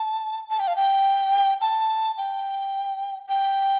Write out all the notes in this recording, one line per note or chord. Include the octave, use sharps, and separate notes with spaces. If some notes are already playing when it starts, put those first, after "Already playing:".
Already playing: A5
A5
G5
F5
G5
A5
G5
G5